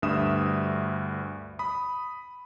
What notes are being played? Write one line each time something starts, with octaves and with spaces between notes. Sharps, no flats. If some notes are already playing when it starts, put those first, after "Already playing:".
D2 G2 E5 D#6 E7
B5 D#6